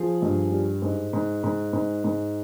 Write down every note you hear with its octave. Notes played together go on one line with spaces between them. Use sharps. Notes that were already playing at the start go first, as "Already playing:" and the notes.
Already playing: F3 G#4
G2
G3
G#2
G#2
G#2
G#2
G#2